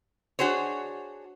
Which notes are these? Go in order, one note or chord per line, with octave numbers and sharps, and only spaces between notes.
D4 F#4 G#4 C5 C#5